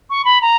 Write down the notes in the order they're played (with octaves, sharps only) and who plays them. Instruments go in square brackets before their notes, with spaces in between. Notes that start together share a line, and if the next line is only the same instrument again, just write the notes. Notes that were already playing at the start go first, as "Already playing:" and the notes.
[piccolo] C#6
B5
A#5